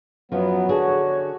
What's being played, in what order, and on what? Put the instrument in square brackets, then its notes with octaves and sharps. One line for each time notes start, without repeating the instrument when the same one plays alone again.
[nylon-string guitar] F#2 F3 [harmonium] F#3 B3
[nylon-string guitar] D3 D4 G#4 [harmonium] F#4 [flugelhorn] C#5